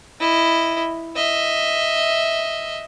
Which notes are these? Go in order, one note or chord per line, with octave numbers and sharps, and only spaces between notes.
E4 D#5
D#5 E5